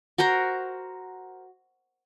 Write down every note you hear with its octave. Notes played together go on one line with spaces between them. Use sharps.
F#4 A#4 C5 A#5